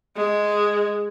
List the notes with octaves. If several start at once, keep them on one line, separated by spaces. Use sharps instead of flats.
G#3